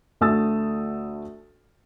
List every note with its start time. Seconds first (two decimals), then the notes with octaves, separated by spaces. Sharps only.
0.21 D2 A3 D#6 E6 A6